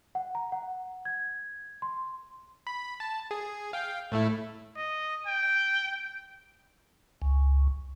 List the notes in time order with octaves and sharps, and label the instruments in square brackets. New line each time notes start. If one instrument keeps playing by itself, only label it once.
[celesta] F#5
A#5
F#5
G#6
C6
[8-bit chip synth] B5
A5
G#4
F5 G5
A2 A3 E4
[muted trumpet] D#5
G5
[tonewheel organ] C#2